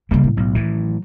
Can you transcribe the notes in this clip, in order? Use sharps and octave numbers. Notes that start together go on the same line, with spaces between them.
F#1 F#2 C#3 G3 A#3
A2
B1
A2 D#3 E3 F#3